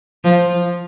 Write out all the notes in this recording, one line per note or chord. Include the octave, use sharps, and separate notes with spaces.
F3